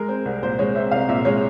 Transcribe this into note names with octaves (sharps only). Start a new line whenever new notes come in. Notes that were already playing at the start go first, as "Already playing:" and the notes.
Already playing: G#3 A#4
C4
C2
A#2 C5
G#3 C#5
C4 E5
C2 F5
A#2 E5
G#3 C#5